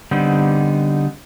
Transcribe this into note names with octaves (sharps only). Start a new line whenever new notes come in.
D3 G3 B3 C4 D#4